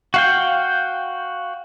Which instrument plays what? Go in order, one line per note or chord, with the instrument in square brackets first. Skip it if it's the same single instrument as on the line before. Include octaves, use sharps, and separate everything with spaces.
[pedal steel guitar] F#4 F5 G5